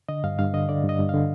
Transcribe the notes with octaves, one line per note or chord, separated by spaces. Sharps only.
D3 D#5
G2 F5
G2 F5
D3 D#5
D3 D5
G2
D#5
G2
D3 F5